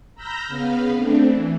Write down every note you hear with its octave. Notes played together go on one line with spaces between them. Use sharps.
A#5 B5 E6 F6 G6 A#6
C#3 B3 B4 F5
A3 C4 D4
E3